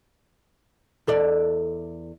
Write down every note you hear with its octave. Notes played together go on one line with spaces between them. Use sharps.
E2 A4 D5